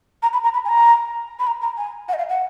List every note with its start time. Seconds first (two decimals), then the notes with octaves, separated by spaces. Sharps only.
0.23 A#5
0.33 B5
0.44 A#5
0.54 B5
0.65 G#5
0.69 A#5
1.39 B5
1.47 A#5
1.62 A#5
1.77 G#5
2.09 F#5
2.14 D#5
2.18 F5
2.29 F#5